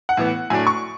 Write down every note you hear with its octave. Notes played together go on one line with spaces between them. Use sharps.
F#5
A2 E3 B3
A2 F#3 A3 D4 G#5
C#6